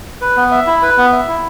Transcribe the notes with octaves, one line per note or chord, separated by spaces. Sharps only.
B4
B3
E5
E4
B4
B3
E5
E4